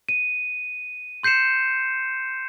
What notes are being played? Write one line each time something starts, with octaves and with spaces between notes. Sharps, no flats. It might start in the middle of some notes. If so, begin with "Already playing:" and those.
D#7
C6 G6 C7 C#7 E7